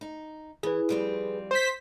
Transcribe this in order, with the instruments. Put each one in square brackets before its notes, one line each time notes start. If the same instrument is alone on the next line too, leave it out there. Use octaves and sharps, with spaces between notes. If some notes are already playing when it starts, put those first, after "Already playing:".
[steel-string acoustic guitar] D#4
[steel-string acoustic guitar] E3 [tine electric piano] G#4 B4
[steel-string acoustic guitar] F2 G3 C4
[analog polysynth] C5 B6